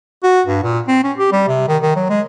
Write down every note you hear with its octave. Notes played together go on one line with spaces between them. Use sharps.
F#4
G2
A#2
C4
C#4
G4
G3
C3
D#3
D#3
F#3
G#3